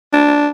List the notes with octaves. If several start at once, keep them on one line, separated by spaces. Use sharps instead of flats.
D4